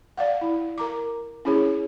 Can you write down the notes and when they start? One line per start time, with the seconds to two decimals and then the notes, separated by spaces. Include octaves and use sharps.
0.17 D5 F5 F#5
0.41 E4
0.78 A#4 A#5 D6
1.45 C#4 E4 G#4 C#5